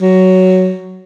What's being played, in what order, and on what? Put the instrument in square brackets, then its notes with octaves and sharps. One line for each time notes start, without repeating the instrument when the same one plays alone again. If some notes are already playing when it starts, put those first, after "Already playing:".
[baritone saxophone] F#3